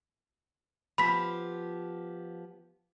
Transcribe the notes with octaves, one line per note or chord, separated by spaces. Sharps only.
F3 B3 G4 B5 B6